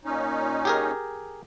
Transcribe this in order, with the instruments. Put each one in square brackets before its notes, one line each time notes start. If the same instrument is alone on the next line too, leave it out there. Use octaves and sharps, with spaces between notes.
[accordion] A#2 C#4 D#4
[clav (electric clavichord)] G4 G#4 A#4